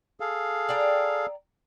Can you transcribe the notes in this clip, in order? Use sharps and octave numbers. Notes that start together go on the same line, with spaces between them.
G#4 A4 F5
D5 G5 A#5